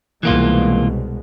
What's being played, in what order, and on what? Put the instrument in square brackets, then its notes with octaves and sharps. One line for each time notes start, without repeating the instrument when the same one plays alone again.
[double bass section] C2 B2 G#3 [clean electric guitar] E3 A#3 F4